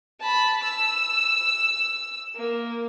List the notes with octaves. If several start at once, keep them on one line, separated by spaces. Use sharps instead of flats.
A5 B5
E6
A#3